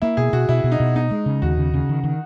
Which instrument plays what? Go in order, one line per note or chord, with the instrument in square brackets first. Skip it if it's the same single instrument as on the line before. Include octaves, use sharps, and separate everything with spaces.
[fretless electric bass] A#3 [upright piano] E4
[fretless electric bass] B2 [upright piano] G#4
[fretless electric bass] B2 [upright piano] F#4
[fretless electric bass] B2 [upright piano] E4
[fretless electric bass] B2
[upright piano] D#4
[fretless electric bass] B2
[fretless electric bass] B3 [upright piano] D#4
[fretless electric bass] G#3
C#3
[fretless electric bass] D#2 [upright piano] F#4
[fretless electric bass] C#3
C#3
D#3
D#3